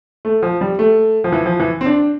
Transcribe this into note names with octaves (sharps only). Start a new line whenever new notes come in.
A3
F3
G3
A3
F3
E3
F3
E3
C4
D4